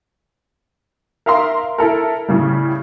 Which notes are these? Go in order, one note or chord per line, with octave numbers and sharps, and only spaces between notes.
A#4 E5 F5 A#5 C6
E4 A4 A#4
A2 C#3 G3